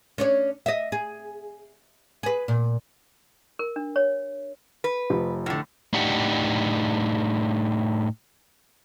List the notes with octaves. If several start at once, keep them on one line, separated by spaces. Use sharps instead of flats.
C#4 D4 C#5
D#5 E5
G#4
G#4 B4
A#2
A#4
D4
C#5
B4
F1 F3
A2 D3
A2 D4 D#4 G4 F#5